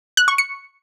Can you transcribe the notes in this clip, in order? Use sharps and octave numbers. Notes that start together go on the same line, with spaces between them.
F#6
C#6
C#7